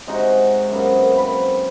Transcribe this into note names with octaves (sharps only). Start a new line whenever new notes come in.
C3 G#3 D#4 F#4
F#2 C3 A#3 B3
C4 B5